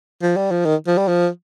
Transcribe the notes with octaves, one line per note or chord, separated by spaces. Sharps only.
F3
G3
F3
D#3
F3
G3
F3